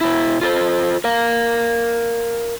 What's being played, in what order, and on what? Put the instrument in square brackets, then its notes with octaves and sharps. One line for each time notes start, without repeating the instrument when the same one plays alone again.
[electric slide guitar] B2 E4
F4 A4 C5
A#4 F5